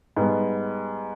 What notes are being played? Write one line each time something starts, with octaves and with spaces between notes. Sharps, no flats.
G#2 G3 B3